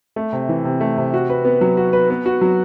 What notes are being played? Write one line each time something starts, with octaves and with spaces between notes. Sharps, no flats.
A3
C3
E3
C3
A3
C3
F#4
B4
B3
F#3
F#4
B4
B3
F#4
F#3